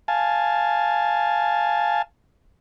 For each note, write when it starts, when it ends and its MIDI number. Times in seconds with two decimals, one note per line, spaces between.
0.08 2.02 77
0.08 2.02 80
0.08 2.02 81